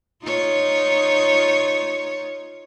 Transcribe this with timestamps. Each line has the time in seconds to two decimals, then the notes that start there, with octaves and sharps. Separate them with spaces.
0.22 D#4 F4 C#5